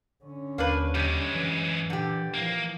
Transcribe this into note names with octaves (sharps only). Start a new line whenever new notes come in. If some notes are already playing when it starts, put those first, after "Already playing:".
D3 C#4
D#2 A#3 D4 B4
F#2 G3 G#3
E3
A#2 D3 G4
E3 F3 A#3